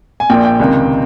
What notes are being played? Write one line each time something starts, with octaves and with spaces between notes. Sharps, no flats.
G#5
A#1 A#2 G5
G5
C#2 C3 D#3